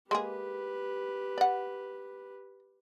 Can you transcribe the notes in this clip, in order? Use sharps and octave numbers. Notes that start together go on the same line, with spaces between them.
G#3 A#3 G4 G#4 B4
D5 F#5